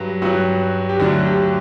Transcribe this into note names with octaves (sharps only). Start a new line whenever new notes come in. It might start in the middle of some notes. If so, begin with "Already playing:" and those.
Already playing: G2 F#3
G2 F#3 F#4
G4
D2 D3 F#3 F#4
G4